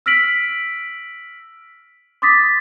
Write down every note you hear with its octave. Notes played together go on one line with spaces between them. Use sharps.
E6 F6 A#6 B6 D7 F#7
C6 D6 D#6 A6 B6